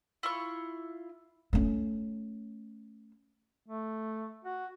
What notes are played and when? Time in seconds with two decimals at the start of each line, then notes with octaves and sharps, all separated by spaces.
0.23 E4 F4 C#6
1.53 A3 C#4
3.68 A3
4.45 F#4